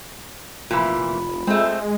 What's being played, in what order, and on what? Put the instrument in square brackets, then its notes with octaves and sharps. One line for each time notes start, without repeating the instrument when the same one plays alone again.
[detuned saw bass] F1 [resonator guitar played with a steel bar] A#2 E3 [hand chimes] F4 B5
[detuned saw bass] G#3 [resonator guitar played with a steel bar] A3 C4